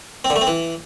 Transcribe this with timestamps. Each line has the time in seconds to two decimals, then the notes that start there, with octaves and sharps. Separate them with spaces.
0.25 C4
0.30 D3
0.36 A3
0.41 C4
0.47 E3